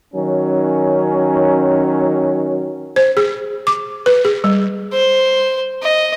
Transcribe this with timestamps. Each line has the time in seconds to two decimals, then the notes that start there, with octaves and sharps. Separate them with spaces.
0.14 D#3 F#3 C#4
2.96 C5
3.17 G#4
3.67 D6
4.06 B4
4.25 G#4
4.44 G3
4.93 C5
5.83 D#5